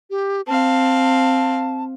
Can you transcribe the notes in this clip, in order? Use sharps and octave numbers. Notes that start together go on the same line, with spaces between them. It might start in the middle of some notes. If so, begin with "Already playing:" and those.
G4
C4 F5 A5